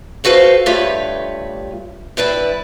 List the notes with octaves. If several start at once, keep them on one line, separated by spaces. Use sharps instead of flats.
E4 F#4 A4 B4 C5 F5
G2 A3 F4 G4 B4 C#5
G2 E4 B4 D5